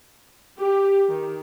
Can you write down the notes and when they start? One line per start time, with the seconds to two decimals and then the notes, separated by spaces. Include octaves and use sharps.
0.58 G4
1.08 D#3